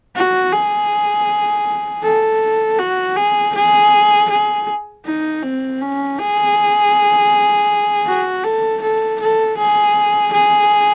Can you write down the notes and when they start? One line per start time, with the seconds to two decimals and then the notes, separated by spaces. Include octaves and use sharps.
0.15 F#4
0.52 G#4
2.03 A4
2.79 F#4
3.16 G#4
3.55 G#4
4.30 G#4
5.05 D#4
5.43 C4
5.81 C#4
6.19 G#4
8.06 F#4
8.43 A4
8.82 A4
9.20 A4
9.58 G#4
10.33 G#4